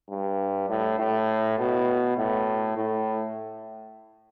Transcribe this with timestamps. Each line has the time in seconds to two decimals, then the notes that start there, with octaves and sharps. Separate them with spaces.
0.10 G2
0.70 A2
0.99 A2
1.59 B2
2.17 A2
2.77 A2